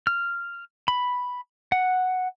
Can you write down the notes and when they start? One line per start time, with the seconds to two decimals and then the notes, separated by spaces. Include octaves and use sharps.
0.07 F6
0.88 B5
1.72 F#5